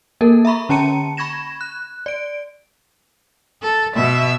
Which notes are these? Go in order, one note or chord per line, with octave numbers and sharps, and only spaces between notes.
A#3 A4 A#4
E5 A#5 B5 C#6
D3 C#4 A5 A#5 C#7 D#7
B5 C#6 G#6 A#6 E7
F#6
D5 D7
A4
B2 E5